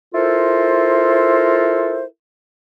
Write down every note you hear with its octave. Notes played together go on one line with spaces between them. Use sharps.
E4 F4 A4 A#4 C5